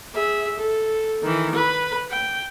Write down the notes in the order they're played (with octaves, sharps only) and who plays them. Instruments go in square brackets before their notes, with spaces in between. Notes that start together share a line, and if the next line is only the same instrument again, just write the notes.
[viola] G#4 E5
A4
D#3 E3
B4
G5